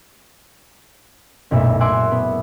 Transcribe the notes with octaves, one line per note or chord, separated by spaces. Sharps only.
F#1 B1 A#2 A3 E5
E5 F#5 G#5 C6 D6 E6
B3